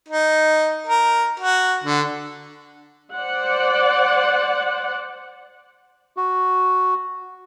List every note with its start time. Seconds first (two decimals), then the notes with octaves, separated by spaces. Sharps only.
0.08 D#4
0.87 A#4
1.40 F#4
1.84 D3
3.13 C5 D5 F#5
6.17 F#4